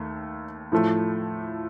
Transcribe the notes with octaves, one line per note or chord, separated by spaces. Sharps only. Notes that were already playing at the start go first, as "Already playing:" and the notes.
Already playing: D#2 A3
A2 F3 A3